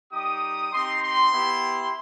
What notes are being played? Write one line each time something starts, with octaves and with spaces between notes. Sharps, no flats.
G3 D#4 G4 D#6
C4 D#4 G4 C6
C6
B3 E4 G4